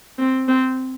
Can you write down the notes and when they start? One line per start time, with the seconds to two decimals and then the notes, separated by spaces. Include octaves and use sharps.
0.18 C4
0.48 C4